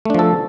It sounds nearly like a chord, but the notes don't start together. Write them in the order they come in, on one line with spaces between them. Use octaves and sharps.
A3 D4 F3 A4